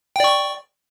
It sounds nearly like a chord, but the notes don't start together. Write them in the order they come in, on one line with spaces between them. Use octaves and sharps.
G5 D5 C#6